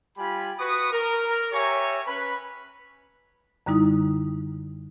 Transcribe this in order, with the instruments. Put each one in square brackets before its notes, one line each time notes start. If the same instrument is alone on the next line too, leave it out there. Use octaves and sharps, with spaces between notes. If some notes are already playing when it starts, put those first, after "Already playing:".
[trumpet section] G3 F4 G4 G#5 B5
F#4 B4 C#6 D#6
A#4
G4 C#5 E5 G#5 A#5 C#6
C#4 B4 B5
[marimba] F#2 D3 G3 D#4 E4 D#6